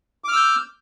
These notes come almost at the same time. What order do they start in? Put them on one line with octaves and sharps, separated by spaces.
D6 F6 E6 G6